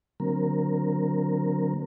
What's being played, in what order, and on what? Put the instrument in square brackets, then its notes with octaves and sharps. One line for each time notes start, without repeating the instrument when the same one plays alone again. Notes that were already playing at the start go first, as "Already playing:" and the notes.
[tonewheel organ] D3 F#3 A#3 C4 A#4